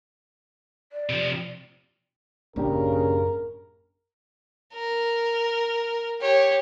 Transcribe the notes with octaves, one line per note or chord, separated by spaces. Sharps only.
D5
C3 F3
A1 F#2 C#3 A#3 D4 G4 A#4
A#4
G4 C#5